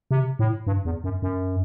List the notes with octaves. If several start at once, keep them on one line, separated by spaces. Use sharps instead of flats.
C3
A2
G2
E2
F#2
F#2